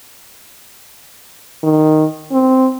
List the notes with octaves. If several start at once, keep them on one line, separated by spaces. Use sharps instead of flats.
D#3
C4